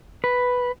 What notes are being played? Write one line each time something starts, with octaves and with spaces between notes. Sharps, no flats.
B4